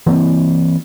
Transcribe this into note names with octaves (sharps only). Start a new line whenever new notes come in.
E3 A#3 C4